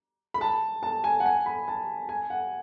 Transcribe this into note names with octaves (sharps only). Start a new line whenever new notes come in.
B5
A5
A5
G#5
F#5
G#5
B5
A5
G#5
F#5